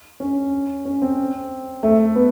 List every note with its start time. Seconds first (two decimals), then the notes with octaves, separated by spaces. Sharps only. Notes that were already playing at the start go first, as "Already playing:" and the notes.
0.20 C#4
0.85 C#4
1.02 C4
1.83 A3
2.16 B3